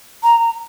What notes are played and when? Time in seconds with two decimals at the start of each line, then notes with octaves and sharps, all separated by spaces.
0.23 A#5